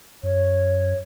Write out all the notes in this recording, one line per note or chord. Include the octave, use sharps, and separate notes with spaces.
F#2 C#5